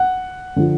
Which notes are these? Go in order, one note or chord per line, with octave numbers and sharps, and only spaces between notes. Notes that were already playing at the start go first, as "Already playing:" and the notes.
Already playing: F#5
D3 F3